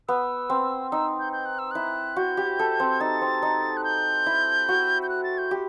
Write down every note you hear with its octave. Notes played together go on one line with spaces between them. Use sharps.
B3 E6
C4
D#4 E6
G6
G6
F#6
E6
E4 F#6
F#4 G6
G4
A4
C4
D#4 A6
C4
D#4
F#6
G6
E4
F#4
G6
F#6
A6
G6
G4